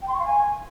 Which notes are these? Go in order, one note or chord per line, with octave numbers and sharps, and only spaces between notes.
G5
C6
C#6
F5
G#5